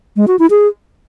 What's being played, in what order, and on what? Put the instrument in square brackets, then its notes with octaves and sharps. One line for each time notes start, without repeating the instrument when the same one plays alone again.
[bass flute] G#3
F#4
E4
G#4